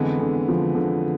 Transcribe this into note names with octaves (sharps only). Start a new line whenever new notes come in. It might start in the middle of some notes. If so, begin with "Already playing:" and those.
Already playing: F2 D3 E3 G#3 B3
D3
F3
D3